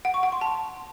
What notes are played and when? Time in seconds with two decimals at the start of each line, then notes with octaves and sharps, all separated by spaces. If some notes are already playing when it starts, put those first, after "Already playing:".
0.05 F#5
0.14 C#6
0.23 F#5
0.32 C6
0.41 A5